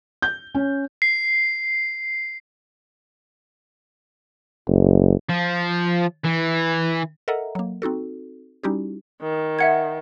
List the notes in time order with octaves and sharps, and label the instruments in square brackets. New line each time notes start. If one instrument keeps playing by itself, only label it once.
[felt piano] G6
C#4
[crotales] C7
[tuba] F#1
[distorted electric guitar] F3
E3
[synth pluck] A4 A#4 D#5 E5 F#5 A#5
F#3 A#3
C4 D#4 F#4 A4
G3 C#4 D#4 E4 F#4 G4
[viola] D#3
[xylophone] E5 F#5 G#6